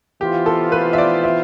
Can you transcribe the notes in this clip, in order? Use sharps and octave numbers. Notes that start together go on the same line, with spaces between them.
E3 B3 F4 G4 C5
A4
B4
E5
D5
E5